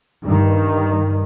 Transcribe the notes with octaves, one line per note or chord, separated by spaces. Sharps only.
G2 D#3